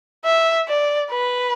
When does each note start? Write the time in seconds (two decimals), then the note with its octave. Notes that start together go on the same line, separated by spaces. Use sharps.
0.25 E5
0.68 D5
1.10 B4